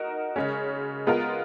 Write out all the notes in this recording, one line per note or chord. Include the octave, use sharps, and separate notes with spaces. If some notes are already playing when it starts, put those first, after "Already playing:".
Already playing: D#4 F#4 A#4
C#3 G#3 C#4
G#3 B3 F4 A#4